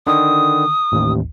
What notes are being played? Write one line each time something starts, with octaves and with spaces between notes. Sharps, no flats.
D3 D#3 D#6
A1 D#2